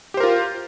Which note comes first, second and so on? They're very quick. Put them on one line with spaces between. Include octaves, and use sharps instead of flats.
G4 C5 A#4 F4